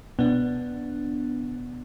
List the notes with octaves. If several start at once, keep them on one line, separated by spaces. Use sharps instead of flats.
B2 B3 D4